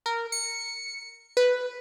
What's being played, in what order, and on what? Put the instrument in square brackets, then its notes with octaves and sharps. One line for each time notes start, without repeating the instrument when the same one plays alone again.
[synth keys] A#4
C#7
B4